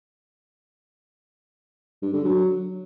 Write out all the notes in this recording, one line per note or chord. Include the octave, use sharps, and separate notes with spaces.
G2
D3
F#3